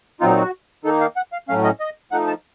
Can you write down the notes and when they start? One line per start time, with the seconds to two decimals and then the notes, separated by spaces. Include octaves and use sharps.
0.20 A#2 F#3 C4 D#4 F4
0.37 F#4
0.84 D#3 A#3 D#4 A4
1.01 F5
1.16 F#5
1.32 F5
1.49 A2 F#3 A3 C#4 F5
1.64 D#5
1.80 D#5
2.11 F3 A3 D#4 F#5
2.27 A5